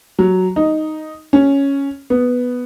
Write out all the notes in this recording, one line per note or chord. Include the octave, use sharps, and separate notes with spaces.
F#3
D#4
C#4
B3